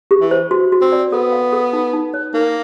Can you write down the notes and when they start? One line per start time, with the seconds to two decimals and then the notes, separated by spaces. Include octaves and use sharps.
0.11 G4
0.20 E3
0.31 C5
0.51 F#4
0.72 F#4
0.82 C4
0.92 D5
1.12 B3 A4
1.32 F5
1.52 A4
1.73 D#4
1.93 D#4
2.14 C#5
2.34 A#3 D#4